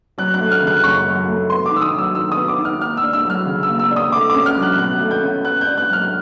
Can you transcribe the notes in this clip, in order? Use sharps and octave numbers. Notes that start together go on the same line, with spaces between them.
F#3 F#6
F#6
A3
F6
C#3 F#6
F#2 C#6
F#3
A3
B3 C6
D6
D#3
E6
D#6
F#3 E6
D#3 E6
D#6
B3
D6
D#3
F6
A#3 F6
E6
D4
E6
F#3 F6
C#3
E6
A#3
E6
D4
D#6
A3 D6
C#4 D6
F6
F#3
F#6
B2 F#6
A3
G6
C#4
B3 F#6
G6
D4
F#6
F#3 F6